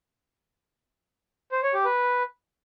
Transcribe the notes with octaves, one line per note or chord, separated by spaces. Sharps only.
C5
C#5
G4
B4